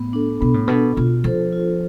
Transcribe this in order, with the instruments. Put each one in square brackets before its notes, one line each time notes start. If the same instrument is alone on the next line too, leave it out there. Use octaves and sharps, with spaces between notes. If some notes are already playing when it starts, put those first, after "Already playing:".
Already playing: [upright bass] A2 [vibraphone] B3
[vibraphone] D4 A4
[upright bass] B2 [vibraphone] B3
[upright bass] A2
[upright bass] B2 [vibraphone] D4 A4
[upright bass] B2 [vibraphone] F4
[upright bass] F3 [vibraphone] A4 C5
[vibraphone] F4